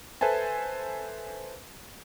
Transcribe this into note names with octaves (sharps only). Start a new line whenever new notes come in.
A4 B4 C5 E5 G#5 A5